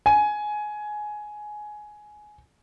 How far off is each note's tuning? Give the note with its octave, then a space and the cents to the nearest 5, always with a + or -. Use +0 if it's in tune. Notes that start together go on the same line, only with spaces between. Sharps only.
G#5 +15